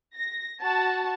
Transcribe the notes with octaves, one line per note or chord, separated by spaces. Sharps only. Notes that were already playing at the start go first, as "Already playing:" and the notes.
A#6
F#4 A5